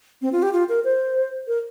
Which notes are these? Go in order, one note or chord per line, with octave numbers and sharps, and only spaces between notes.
C4
F4
G4
F4
A#4
C5
A#4